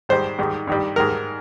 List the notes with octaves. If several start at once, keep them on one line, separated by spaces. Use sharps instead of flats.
G#2 D#3 G3 C5
G#2 D#3 G3
G2 D#3 G3
G#2 D#3 G3 A#4